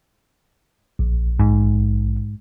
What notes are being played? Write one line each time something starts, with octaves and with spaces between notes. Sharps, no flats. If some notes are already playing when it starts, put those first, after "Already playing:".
A#1
G#2